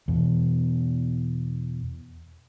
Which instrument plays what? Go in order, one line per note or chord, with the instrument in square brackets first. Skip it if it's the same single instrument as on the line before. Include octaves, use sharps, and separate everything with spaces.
[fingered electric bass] E2 B2